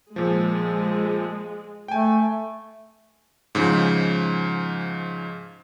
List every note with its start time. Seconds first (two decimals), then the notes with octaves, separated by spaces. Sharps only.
0.16 A#2 F3 G#3
1.88 A3 G5 G#5
3.55 G#2 C#3 F3